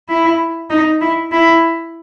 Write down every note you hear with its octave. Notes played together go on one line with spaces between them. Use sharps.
E4
D#4
E4
E4